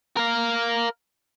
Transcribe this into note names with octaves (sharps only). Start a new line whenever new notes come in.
A#4 F5